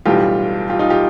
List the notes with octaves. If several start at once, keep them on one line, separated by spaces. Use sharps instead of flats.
B1 A2 E3 G3 F4 G4
F4 G4
D#4 F4
F4 G4